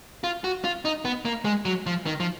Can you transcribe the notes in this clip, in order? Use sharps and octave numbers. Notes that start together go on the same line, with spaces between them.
F4
F#4
F4
D#4
B3
A#3
G#3
F#3
F3
D#3
F3